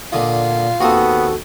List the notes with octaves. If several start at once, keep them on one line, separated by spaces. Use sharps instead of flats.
A#2 D3 F4 D#5
D#2 B3 C4 F#4 A4 D#6